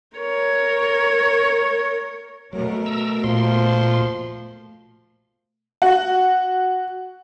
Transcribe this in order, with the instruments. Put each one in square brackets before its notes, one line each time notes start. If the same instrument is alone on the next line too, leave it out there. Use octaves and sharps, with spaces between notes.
[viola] A#4 C#5
[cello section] B2 A3 A#4 [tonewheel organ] F#3
[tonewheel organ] A#5 E6
[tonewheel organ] A#2 C6 [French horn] F3
[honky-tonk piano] F#4